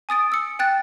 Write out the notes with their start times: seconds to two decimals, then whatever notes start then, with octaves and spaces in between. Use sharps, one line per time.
0.09 G#5 D#6 A6 D7
0.32 E6 C#7
0.59 G5 F#6 A6